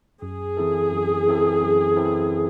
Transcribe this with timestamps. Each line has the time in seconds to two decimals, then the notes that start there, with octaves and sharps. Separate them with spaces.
0.22 F#2 G#4
0.57 E3 C4 E4 A4
0.92 F#2
1.27 E3 C4 E4 A4
1.62 F#2
1.96 E3 C4 E4 A4